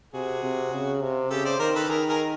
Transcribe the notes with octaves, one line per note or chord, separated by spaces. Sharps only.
C3 F#4 G#4
C3
C#3
C3
C#3 G4 A4
C5 D5
D#3 A#4 C5
A4 B4
D#3 G#4 A#4
G#4 A#4